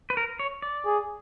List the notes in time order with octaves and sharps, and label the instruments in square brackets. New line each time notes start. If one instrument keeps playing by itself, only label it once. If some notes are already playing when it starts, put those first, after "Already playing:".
[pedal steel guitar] B4
A#4
C#5
D5
[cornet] G#4